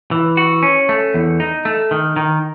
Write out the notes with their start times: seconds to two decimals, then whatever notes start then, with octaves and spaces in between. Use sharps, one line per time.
0.11 E3
0.37 F#4
0.63 C#4
0.89 A3
1.14 E2
1.40 D#4
1.65 A3
1.91 D#3
2.16 D#3